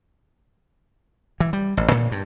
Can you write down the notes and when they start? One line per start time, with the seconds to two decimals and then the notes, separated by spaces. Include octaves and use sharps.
1.40 E3
1.53 G3
1.77 A1
1.91 A#2
2.11 G2